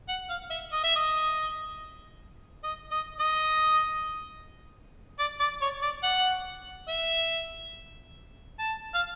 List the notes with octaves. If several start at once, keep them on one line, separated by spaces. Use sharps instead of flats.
F#5
F5
E5
D#5
E5
D#5
D#5
D#5
D#5
D5
D5
C#5
D5
F#5
E5
A5
F5